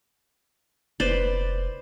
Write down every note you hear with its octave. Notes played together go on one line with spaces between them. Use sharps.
F1 B4 C5 D5